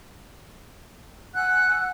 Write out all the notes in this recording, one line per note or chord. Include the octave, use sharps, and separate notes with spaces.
F#5 G#5 E6 F#6